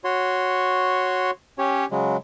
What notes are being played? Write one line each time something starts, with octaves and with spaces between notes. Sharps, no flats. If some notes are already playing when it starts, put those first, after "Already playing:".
F#4 C#5 C6
C#4 G4 C#5
C#3 F#3 G#3